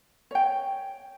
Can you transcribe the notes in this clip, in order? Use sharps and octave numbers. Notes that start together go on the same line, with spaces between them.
C#5 G5